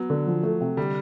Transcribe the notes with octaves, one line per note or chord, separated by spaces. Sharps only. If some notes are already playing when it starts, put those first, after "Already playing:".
Already playing: F#3 B3
D3
F3
A3
C3
D3 G3